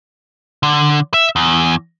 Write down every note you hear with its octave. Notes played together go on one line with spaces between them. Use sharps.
D3
E5
E2